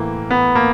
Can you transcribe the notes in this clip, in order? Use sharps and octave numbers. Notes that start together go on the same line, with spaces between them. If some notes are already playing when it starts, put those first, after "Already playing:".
Already playing: A2 E3 A#3
B3
A#3